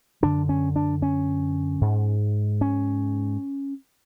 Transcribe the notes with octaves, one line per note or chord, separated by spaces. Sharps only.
F#2 D3 D4
C#4
D4
C#4
G#2
C#4